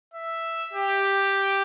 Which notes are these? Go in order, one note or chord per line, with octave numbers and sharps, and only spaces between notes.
E5
G4